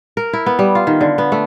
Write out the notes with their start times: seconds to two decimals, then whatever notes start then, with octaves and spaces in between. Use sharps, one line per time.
0.17 A#4
0.33 E4
0.46 B3
0.59 G3
0.75 F4
0.87 D#3
1.01 D3
1.18 B3
1.32 A3